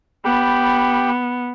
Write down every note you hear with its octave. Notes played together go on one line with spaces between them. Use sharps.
B3 G4 G5 B5